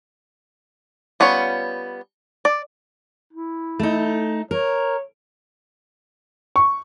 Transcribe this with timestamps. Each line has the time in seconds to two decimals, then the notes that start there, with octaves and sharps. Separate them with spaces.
1.20 G3 B3 C#4 F4 C#5
2.45 D5
3.33 E4
3.79 A3 D#4
4.51 A#4 C#5
6.56 C#6